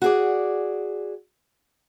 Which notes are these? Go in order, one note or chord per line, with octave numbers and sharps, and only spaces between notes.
F#4 G#4 D5